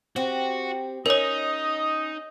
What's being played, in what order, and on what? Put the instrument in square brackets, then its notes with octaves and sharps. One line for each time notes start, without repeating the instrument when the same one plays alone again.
[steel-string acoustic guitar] C4 G4 [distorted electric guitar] F#4
[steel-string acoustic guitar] C#4 [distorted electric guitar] D#4 [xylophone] A#4 C#5 [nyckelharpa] D#5